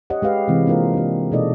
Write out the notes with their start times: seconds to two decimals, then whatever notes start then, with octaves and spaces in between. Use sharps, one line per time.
0.10 G4 C#5 D#5 F#5
0.22 G#3 G4 B4 F5
0.48 C3 E3 G#3 C4
0.67 A#3 D4 F4 A#4 C5 F5
0.94 D4 G4
1.31 B2 G#3 D#4 A4 D5 D#5